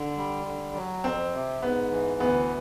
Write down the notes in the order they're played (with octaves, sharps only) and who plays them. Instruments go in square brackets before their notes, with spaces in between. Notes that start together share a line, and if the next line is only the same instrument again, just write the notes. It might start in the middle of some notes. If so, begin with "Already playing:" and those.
Already playing: [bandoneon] D3
G3
D3
F#3
[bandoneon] F2 [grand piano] C4
[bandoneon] C3
[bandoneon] G#2 [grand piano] B3
[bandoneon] E3
[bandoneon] D2 [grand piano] B3